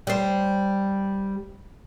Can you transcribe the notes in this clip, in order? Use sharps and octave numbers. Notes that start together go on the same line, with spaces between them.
G3 C5